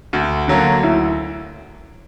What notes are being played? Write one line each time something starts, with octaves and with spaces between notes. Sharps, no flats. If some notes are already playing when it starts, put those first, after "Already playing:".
D2 F#4
D3 F#3 A#3 C#4 F#4
D2 E4